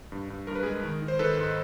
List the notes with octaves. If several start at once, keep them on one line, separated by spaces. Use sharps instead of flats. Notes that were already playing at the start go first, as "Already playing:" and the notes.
G2
G2
G2 A#4
B4
G#3 G#4 A#4
D#3
D#3
C5
D#3 A4 B4
G#2